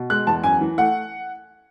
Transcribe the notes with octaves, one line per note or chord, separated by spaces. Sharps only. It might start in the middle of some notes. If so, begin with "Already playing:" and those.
Already playing: B2
G#3 F#6
E2 A5
F#2 G#5
E3
A3 F#5